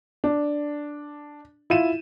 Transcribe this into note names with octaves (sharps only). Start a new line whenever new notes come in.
D4
E4 F4 D#7 E7